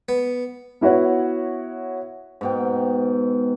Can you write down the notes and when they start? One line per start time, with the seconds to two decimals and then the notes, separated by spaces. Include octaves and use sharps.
0.09 B3
0.81 B3 E4 F#4 C#5 F#5
2.41 G#2 B2 G5